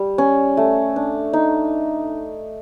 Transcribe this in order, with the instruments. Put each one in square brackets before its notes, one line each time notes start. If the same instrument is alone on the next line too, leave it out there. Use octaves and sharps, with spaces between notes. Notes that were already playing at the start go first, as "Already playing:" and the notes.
Already playing: [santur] G3
C#4
A3
D4
D#4